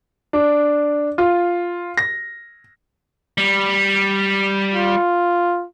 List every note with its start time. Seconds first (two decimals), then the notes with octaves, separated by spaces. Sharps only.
0.33 D4
1.18 F4
1.97 A#6
3.38 G3
4.75 F4